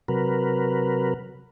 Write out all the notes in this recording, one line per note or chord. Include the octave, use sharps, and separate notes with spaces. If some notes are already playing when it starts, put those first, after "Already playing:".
C3 F#3 A#4 B4